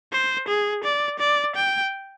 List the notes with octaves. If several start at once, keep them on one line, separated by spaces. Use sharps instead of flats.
C5
G#4
D5
D5
G5